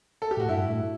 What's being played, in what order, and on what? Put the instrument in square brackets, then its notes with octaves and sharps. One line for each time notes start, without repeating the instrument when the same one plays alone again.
[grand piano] A4
G4
[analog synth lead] A2 [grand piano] F#4
[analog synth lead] G2 [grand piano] E4
[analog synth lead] A2